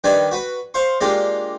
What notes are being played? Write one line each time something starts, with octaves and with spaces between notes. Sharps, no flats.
D#3 G3 D4 B4 D5 G#5
F#4 B4
C5 F5 C6 C#6
G#3 A#3 D4 F4 G4